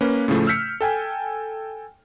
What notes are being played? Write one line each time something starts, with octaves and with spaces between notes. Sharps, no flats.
A#3 C#4 B4
A2 C#3 F3 A3
E6 F6 G6 B6 C#7
A4 G5 G#5